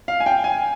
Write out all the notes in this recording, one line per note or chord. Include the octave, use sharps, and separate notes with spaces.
F5
G#5
G5
G#5